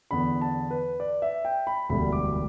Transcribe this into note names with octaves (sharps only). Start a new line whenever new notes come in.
E2 D3 B3 B5
A5
B4
D5
E5
G5
B5
E1 D2 D3 G3 B5
D6